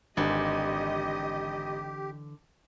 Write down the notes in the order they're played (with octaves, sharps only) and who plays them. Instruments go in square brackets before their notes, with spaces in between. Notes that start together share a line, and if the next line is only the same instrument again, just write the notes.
[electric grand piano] G#1 [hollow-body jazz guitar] D3 E3 D4 [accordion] G4 [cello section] D#5